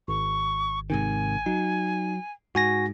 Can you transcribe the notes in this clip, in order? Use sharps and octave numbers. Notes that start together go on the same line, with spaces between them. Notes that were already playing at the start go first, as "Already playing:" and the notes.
G#1 C#6
G#2 C3 D#3 G#5
F#3 D#4
G#2 F#4 G#5 A#6